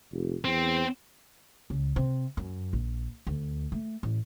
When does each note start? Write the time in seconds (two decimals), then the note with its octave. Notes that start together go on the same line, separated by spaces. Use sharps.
0.12 F1
0.45 E2 C4
1.70 C#2
1.96 C3
2.37 F#2
2.73 A#1
3.27 D2
3.72 A3
4.03 A1